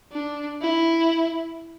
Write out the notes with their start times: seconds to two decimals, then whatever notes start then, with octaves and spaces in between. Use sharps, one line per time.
0.12 D4
0.61 E4